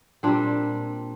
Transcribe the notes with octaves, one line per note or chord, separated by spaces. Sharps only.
A#2 G3 C4 D4